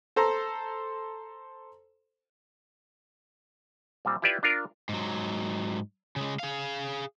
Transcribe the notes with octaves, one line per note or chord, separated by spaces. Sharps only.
A4 C5 A#5 C6
A#2 G3 C4
E4 F4 G4 B4 D5 E5
D4 F4 A#4
G#2 F#3
C#3 G#3
G#4 F5